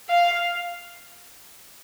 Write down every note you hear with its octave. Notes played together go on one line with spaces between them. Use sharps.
F5